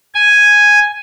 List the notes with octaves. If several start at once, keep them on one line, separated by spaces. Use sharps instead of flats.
G#5